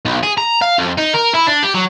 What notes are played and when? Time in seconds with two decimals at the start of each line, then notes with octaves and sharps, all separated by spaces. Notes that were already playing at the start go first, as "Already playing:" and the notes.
0.05 B1
0.23 G#4
0.38 A#5
0.62 F5
0.78 F2
0.98 D#4
1.14 A#4
1.35 E4
1.47 D4
1.63 G4
1.75 F#3